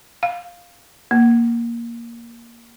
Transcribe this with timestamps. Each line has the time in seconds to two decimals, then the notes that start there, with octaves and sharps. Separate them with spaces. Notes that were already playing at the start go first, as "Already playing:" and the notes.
0.23 F5
1.11 A#3